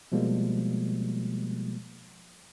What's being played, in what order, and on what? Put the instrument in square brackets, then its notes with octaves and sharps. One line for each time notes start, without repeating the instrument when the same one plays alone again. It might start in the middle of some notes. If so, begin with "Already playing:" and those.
[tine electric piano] B2 F3 G3 G#3 A#3